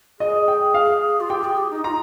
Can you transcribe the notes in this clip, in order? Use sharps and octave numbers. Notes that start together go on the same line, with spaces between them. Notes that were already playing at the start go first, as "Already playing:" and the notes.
G#4 D#5
G5
F5
F4
G4 G5
G#4
G4
D#4
F4 A#5